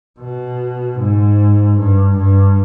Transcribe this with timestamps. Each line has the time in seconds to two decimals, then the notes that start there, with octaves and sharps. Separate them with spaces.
0.20 B2
1.00 G#2
1.79 G2
2.17 G2